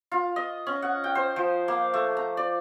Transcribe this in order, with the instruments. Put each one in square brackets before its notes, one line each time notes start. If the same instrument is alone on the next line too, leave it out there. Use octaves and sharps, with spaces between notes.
[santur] F4
D#5
C#4
F#5
G5
C5
F3
A#3
A3
A#5
D5